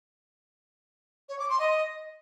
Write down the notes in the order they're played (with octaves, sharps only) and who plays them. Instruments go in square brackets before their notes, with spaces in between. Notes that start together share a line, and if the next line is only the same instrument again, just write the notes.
[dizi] C#5
D6
C6
D#5